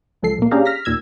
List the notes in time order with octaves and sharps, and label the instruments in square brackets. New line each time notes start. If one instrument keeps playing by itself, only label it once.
[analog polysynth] C#2 F3 A4 C7
A#2 A#3
C#4 D4 G4 G#4 F5 A#5
F6 A#6 B6
D#2 A#2 E6 G#6